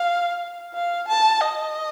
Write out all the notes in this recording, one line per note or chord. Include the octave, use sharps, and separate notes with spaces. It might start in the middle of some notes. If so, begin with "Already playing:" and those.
Already playing: F5
F5
A5
D#5